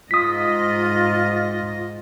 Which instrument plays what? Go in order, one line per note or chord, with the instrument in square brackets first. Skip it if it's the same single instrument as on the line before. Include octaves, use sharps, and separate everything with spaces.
[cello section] G#2 D#5 [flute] F4 [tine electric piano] D#6 B6